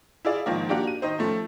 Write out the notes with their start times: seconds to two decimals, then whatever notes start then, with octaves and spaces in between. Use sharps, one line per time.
0.25 E4 F4 G#4 D5
0.46 G#2 D#3 F3 A#3
0.69 A#3 D4 F#4 G4
0.87 D#7
1.02 D#3 D#4 C5
1.19 F3 A3 C#4